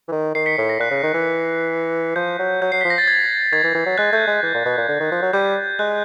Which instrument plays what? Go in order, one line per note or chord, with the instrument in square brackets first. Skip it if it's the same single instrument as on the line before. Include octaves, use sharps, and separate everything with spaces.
[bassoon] E3
D#3
[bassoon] D#3 [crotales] C7
[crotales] B6 C#7
[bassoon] A2 [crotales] B6
[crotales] A#6
[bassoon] A#2 [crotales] F#6
[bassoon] C#3
D#3
E3
[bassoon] F3 [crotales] G6
[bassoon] F#3
[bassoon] F#3 [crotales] G6
[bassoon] F#3 [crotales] C7
[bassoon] F3 [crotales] B6
[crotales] A#6
A6
G#6
[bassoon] D#3 [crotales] G#6
[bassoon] E3
E3
F#3
[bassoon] G#3 [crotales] F#6
[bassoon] A3 [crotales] G6
[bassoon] G#3
E3
A#2
B2
A#2
D3
D#3
F3
F#3
[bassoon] G3 [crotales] G6
[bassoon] G#3 [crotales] F#6